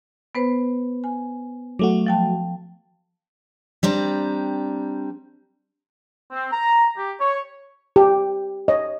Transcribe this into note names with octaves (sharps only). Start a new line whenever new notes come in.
B3 B4 C5
G#5
F#3 A3 F#4 D6
F3 G5 A5
G3 C4 D4 A#5
C4
A#5
G4
C#5
G4
C#5 D#5